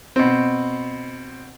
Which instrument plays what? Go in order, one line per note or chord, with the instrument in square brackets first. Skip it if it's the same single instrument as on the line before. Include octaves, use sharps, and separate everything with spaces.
[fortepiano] B2 C4